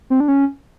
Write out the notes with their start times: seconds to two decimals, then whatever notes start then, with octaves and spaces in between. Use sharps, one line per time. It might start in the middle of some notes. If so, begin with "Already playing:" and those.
0.10 C4
0.20 D4
0.28 C#4